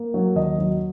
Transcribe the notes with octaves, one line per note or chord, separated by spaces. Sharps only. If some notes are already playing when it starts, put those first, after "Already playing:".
Already playing: A#3
F#3
D#2 D#5
F#3